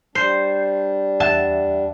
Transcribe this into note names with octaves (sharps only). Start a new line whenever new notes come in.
G3 D4 C5
E2 E5 F#5 A5